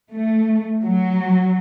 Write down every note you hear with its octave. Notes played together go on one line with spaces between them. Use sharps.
A3
F#3